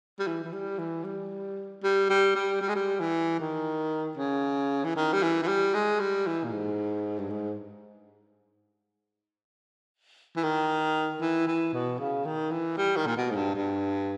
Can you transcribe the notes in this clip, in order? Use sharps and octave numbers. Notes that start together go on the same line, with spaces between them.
G3
E3
E3
G3
E3
G3
G3
G3
G3
G3
G#3
G3
E3
D#3
C#3
E3
D#3
G3
E3
E3
G3
G#3
G3
E3
A#2
G#2
G2
G#2
E3
D#3
E3
E3
B2
C#3
D#3
E3
G3
D#3
A#2
B2
G#2
G2
G2